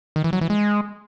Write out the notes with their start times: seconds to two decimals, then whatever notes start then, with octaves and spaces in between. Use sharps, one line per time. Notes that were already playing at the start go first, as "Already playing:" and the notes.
0.16 D#3
0.24 E3
0.33 F#3
0.41 E3
0.50 G#3